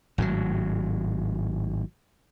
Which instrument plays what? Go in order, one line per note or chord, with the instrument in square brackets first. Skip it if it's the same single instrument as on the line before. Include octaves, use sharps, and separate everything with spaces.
[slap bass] G#1 A2 C3 F#3